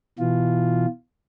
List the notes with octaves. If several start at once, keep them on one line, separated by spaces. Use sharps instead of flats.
B2 E3 F4